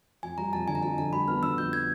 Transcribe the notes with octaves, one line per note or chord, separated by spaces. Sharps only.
F2 G#5
G3 A#5
F2 A5
D3 G#5
A#5
F2 A5
D3 A5
G3 B5
B3 F6
D3 E6
F2 G6
G#6